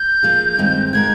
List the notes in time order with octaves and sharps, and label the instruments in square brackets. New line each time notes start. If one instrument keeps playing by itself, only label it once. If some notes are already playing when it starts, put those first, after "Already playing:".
Already playing: [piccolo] G6
[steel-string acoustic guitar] F3 A#3 F4 G#4
G2 D#3 G#3 C4 F4
[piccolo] G6
[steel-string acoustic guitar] D3 G#3 D#4 A#4 [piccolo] G#6